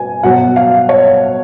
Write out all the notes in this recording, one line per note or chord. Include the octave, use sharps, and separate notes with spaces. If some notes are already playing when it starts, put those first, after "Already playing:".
Already playing: B2 B4 G#5
B2 F#3 F#5
F5
C#5